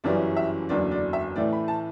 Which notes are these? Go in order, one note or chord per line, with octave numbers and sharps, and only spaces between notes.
G1 F#2 E3 G3 C#4 D5
E5
F#1 E2 D3 F#3 D5
D5
E5
A2 E3 A3 D5
B5
A5